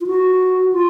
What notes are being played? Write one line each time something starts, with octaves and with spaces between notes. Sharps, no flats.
F4
F#4
F4